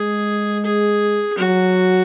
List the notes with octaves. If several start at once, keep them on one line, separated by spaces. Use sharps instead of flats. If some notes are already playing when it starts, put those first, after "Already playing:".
Already playing: G#3 G#4
G#4
F#3 F#4